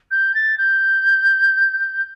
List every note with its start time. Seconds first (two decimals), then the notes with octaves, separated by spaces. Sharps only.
0.11 G6
0.35 A6
0.58 G6